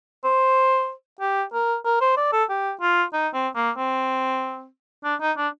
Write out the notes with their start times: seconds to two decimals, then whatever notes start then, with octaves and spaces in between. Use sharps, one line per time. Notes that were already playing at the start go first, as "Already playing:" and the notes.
0.24 C5
1.21 G4
1.53 A#4
1.85 A#4
2.01 C5
2.17 D5
2.33 A4
2.49 G4
2.81 F4
3.13 D#4
3.34 C4
3.56 A#3
3.77 C4
5.04 D4
5.21 D#4
5.37 D4